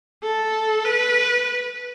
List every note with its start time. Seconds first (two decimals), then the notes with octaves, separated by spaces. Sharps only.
0.23 A4
0.85 B4